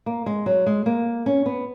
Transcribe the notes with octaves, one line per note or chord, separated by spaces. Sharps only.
A#3
G#3
F#3
G#3
A#3
C#4
B3